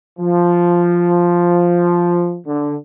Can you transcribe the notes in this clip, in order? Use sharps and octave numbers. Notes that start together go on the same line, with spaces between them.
F3
D3